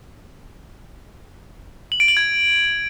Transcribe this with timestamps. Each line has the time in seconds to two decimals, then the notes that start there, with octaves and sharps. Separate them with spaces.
1.92 F#7
2.00 D7
2.08 F#7
2.17 G#6